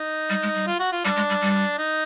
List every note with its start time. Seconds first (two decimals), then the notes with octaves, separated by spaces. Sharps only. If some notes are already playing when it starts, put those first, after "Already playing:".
Already playing: D#4
0.30 G3
0.42 G#3
0.55 G3
0.67 F4
0.80 F#4
0.92 F4
1.05 G3 D4
1.16 G#3
1.30 G3
1.41 G3
1.79 D#4